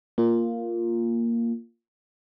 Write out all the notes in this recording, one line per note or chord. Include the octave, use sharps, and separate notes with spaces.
A#3 F4